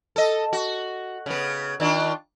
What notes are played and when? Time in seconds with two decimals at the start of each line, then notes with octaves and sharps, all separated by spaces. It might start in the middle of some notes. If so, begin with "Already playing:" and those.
0.16 A4 D#5
0.53 F#4
1.26 C#3 B3
1.80 D#3 D4 F4